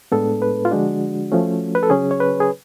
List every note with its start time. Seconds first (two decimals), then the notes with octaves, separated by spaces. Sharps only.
0.12 A2 G#3 B3 D4 A4
0.42 B4
0.65 F4
0.71 D3 F3 G#3 D4 F#4
1.32 F3 A3 C#4
1.75 B4
1.83 A4
1.90 C#3 F#3 C#4 G#4
2.11 C#5
2.20 B4
2.40 G#4